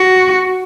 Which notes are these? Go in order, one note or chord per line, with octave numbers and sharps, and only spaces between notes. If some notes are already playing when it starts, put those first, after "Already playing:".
Already playing: F#4